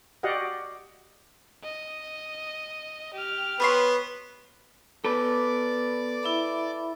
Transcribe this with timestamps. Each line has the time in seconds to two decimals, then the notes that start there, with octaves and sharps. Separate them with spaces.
0.23 F#4 G4 D5 D#5 F5 F#5
1.63 D#5
3.14 G4 F6
3.60 B3 B4 C#5 C6
5.05 B3 A4 B4 D5 D6
6.23 E4 E5 B5